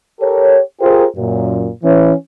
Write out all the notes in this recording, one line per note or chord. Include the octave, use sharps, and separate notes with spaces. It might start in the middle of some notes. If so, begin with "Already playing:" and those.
G4 A4 A#4 C#5
F4 G4 G#4 A#4 C5
F#2 A#2
E3 C#4